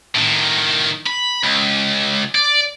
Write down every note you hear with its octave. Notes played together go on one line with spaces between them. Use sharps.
A2 D#3
B5
C#2
D5